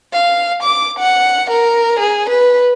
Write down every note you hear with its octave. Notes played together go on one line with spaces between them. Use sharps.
F5
D6
F#5
A#4
G#4
B4